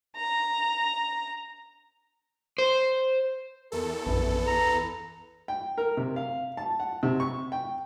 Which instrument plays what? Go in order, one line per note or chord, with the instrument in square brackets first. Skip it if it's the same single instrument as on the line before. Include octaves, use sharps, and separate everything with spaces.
[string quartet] A#5
[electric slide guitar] C5
[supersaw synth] E2 A4 [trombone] A#4
[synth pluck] A#1 F#2 [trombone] B4
[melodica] A#5
[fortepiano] G5
A#4
C3
F5
A5
F#5
C3
C#6
G5